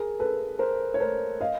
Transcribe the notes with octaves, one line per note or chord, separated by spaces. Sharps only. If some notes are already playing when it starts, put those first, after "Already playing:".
Already playing: G#4 A#4
A4 B4
A#4 C5
C#5
A#4 C5
D#5 F5